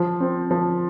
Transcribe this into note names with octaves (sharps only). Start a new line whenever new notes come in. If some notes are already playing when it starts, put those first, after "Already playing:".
Already playing: F3
C4
F3